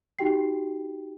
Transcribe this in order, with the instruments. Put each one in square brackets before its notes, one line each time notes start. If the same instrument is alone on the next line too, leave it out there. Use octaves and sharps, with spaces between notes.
[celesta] D#4 F#4 G4 G5 C7